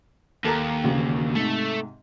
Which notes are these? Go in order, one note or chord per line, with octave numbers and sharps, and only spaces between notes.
D#2 A4 A#4 A#5
E1 D2 C#3
G#2 C3 A3